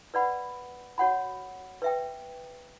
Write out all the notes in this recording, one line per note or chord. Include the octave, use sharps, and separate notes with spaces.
B4 D5 F#5 B5
F#4 C#5 F#5 B5
B4 E5 G5